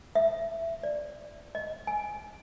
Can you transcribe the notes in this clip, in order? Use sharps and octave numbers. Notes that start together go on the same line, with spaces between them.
E5
D5
D#5
G#5